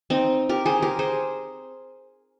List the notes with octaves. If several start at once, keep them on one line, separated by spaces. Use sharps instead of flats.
C4 D#4
G4 A#4
G#4 C5
G4 A#4
G#4 C5